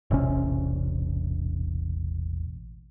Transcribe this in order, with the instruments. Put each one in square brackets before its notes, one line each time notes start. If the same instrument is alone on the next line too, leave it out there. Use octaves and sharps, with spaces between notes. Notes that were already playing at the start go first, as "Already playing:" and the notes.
[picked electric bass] E1 A1 C3 C#4